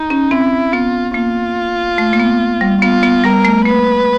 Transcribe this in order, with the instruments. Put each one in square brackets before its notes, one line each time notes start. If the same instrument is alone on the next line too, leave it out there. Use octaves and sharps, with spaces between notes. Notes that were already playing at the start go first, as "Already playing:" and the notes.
Already playing: [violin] D#4
[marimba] C#4
[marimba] C4 [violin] E4
[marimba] B3 [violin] F4
[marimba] A#3 [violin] F4
[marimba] A3
A#3
B3
G3
[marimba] B3 [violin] F4
[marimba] B3
[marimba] G3 [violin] A#4
[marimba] A3
[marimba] A#3 [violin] B4